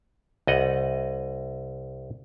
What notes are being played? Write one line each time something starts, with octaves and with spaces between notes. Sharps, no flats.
C2 D#5 F#5